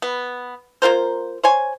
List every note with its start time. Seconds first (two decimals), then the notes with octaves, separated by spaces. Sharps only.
0.02 B3
0.82 A#3 F4 A#4 C5
1.43 C5 C#5 G#5